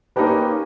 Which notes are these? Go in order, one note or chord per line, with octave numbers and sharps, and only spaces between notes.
A#3 D4 D#4 G4 B4
C#4
C4
C#4